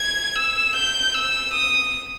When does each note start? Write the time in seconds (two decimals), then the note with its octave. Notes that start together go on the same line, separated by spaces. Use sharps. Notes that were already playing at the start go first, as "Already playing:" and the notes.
Already playing: G#6
0.35 E6
0.75 G6
1.14 E6
1.53 D#6